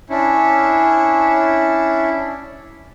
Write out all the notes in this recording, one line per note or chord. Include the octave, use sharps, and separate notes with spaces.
C#4 D4 E4